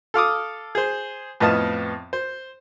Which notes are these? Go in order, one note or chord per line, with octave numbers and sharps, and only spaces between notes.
A4 F5 D6 D#6
G#4 C5
F2 A2 B3 D#5 F5 A5
C5